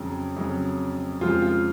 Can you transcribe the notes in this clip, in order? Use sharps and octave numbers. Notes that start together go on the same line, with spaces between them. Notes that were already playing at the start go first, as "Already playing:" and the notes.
Already playing: F2 C#3 F#3
F2 C#3 F#3
F2 C#3 F3 G#3 F4
F4